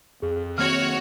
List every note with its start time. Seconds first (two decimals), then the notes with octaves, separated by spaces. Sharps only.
0.22 F2 G#4
0.58 D#3 A#3 C4 F#4 C#5 F6 G#6